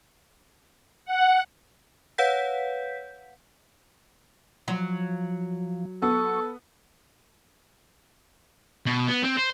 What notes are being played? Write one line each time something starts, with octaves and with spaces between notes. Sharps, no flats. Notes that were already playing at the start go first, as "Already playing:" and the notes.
F#5
B4 C#5 F5 F#5 G6 B6
F3 F#3
B3 A4 C#6
B2
B3
C4
C5